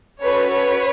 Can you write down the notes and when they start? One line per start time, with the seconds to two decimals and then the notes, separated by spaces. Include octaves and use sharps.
0.22 C#4 F#4 A4 B4 C#5
0.53 B4 C#5